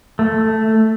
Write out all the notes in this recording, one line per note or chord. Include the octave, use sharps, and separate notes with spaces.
A3